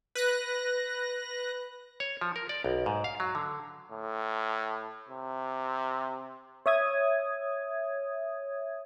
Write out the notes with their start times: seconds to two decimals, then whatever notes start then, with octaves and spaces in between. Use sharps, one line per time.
0.15 B4 F#6 A#6
2.00 C#5
2.21 F3
2.36 A#4
2.49 D5
2.64 B1
2.86 G#2
3.04 F5
3.20 F#3
3.35 D3
3.91 A2
5.09 C3
6.66 C#5 E5 D#6 G#6